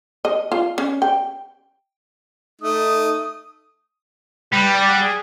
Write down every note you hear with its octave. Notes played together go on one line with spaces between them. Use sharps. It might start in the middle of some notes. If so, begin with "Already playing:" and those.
D#5
F4
C#4
G5
A3 D#4 D#6
G3 B4
D5
F#5
G#4